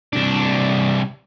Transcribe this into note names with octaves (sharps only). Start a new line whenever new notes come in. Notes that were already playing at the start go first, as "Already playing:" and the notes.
C2 D4